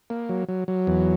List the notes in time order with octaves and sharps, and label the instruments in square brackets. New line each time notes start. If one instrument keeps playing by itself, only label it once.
[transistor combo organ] A#3
F#3
F#3
F#3
E2